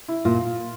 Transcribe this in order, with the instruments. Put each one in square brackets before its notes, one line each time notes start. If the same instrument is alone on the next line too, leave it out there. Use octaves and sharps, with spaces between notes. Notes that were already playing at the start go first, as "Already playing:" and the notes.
[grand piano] E4
[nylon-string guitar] A#2 [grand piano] F4